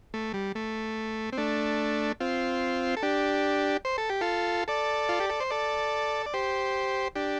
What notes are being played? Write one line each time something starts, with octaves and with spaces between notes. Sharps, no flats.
A3
G3
A3
C4
A3 D4
C4 F4
A4
D4 G4
C5
A4
G4
F4 A4
A4 D5
F4
G4
A4
C5
A4 D5
D5
G4 C5
D4 G4